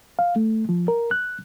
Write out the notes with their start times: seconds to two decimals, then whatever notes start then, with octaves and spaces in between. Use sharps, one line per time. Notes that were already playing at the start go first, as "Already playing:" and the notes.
0.19 F5
0.36 A3
0.69 F3
0.88 A#4
1.11 F#6